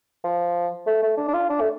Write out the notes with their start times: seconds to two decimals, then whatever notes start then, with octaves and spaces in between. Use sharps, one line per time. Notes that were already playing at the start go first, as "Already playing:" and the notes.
0.24 F3
0.87 A3
1.03 A3
1.18 D4
1.28 D4
1.34 F4
1.50 D4
1.60 A3